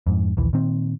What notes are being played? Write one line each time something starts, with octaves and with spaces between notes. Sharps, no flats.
F2 G#2
A#1 D#2 E3
A#2 D#3 C4